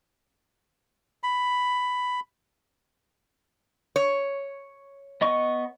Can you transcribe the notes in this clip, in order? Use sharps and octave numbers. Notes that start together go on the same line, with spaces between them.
B5
C#5
B3 D#5 C#6